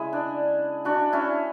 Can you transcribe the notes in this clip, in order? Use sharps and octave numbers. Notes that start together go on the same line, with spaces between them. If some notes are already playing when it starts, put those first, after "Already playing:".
Already playing: C#3 G#3 E4 G#4
D4
D4 F#4
C#4 E4